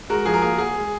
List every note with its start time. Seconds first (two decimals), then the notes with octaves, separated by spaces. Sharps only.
0.09 G#3 F#4 A#4
0.25 F3 G#4
0.34 A#4
0.42 A#3 G#4
0.58 F#4 G#4
0.75 G#3